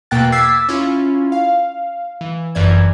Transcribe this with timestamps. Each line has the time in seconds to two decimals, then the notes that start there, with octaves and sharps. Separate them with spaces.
0.11 E2 B2 A#3 G5 F#6 A6
0.32 D6 E6 G#6 A6 B6 C7
0.69 C#4 E4 F4
1.32 F5
2.21 E3
2.55 G1 F#2 E3 D5 G#6